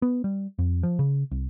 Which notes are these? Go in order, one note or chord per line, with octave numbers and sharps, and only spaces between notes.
B3
G3
F2
F3
C#3
C2